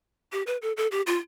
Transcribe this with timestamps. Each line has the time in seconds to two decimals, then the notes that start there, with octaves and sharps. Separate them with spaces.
0.32 G4
0.47 B4
0.62 A4
0.77 A4
0.91 G4
1.07 F4